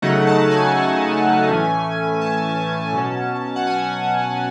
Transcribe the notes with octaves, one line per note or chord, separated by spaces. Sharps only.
C#3 F#3 A3 D#4 F#5
A5
G#5
A2 E3 A3 C#4
A5
B2 F#3 C#4
F#5
G#5